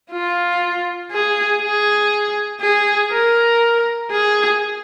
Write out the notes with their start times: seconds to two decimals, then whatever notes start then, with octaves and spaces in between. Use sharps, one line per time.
0.11 F4
1.11 G#4
1.62 G#4
2.61 G#4
3.11 A#4
4.11 G#4